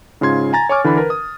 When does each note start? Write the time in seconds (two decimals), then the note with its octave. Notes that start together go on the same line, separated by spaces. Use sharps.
0.21 G#2 C#3 F4 C6 G#6
0.53 G#5 A#5 A6
0.69 C#5 G#5 C#6 D6 F6
0.84 D3 E3 D4 B5
0.97 A#4 B4
1.10 D#6